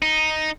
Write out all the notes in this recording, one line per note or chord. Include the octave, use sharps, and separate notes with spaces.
D#4